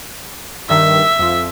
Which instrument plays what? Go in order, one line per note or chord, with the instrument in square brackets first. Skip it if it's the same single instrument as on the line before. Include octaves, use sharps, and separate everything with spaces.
[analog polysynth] G2 D#3 [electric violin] E5
[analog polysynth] F2 F3